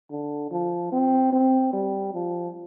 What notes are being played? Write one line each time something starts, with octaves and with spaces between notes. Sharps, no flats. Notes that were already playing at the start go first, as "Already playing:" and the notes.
D3
F3
C4
C4
G3
F3